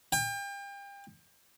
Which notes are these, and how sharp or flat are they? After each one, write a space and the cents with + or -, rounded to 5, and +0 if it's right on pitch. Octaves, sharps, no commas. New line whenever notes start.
G5 +35